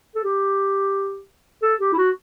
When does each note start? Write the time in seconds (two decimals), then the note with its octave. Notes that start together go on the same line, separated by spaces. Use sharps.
0.15 A4
0.24 G4
1.62 A4
1.81 G4
1.93 E4
1.98 F#4